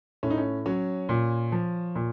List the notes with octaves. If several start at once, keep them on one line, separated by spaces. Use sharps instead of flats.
A2 C#4
D#4
C#4
F#3 C#4
A#2
F3
A#2